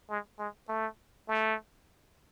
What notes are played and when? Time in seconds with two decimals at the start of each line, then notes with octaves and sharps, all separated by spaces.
0.10 G#3
0.39 G#3
0.69 A3
1.28 A3